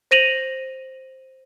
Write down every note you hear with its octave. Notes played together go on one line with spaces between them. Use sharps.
C5 A#6 D#7 F7 F#7